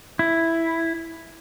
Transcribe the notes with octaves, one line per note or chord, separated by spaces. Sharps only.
E4